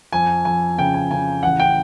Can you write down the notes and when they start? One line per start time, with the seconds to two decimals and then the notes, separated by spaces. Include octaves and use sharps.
0.12 F2 G#5
0.45 F2 G#5
0.78 C#3 G5
0.94 G#5
1.11 C#3 G#5
1.43 A1 F#5
1.60 G5